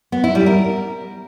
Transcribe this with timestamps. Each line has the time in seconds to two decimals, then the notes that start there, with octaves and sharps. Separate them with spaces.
0.12 B3
0.24 E4
0.35 G3
0.46 A#4